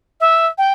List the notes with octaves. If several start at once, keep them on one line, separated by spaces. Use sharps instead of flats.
E5
G5